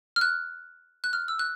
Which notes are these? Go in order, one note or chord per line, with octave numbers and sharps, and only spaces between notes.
F6
F#6
F#6
F6
E6
F#6